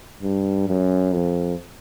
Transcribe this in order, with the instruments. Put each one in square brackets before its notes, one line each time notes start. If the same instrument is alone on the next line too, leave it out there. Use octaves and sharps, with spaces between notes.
[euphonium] G2
F#2
F2